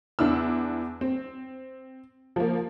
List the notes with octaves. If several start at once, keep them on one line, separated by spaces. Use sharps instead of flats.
E2 D4 E4 E6
C4
F3 A#3